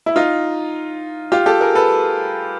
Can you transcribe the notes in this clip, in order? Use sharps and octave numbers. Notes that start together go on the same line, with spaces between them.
E4
D#4 F4
F4 G4
G4 A4
G#4 A#4
A4 B4